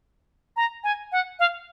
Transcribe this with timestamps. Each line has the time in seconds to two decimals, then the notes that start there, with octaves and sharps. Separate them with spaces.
0.57 A#5
0.84 G#5
1.12 F#5
1.39 F5